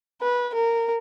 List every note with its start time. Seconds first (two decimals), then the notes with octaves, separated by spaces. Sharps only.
0.22 B4
0.54 A#4